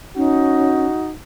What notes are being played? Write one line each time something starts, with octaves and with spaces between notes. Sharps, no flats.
C#4 D#4 F#4